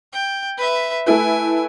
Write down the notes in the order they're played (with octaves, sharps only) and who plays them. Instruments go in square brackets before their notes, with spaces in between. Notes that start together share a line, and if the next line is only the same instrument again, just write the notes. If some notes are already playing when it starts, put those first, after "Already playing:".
[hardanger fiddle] G5
B4 E5
[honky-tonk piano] A3 E4 B4 [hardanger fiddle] G#5